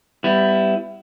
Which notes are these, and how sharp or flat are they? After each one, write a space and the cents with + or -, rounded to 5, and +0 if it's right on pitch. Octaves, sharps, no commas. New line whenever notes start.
G3 +0 B3 +35 E4 +10